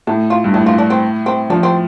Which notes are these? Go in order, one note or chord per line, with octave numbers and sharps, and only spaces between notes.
A2 A4
F4
G2
A2 D4
F4
D4
C4
C4
F3 D4
C4